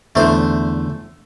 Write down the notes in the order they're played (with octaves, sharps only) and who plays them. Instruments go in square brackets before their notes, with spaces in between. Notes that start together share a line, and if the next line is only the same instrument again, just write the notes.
[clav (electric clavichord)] E2 D3 A#5 [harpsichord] A3 C5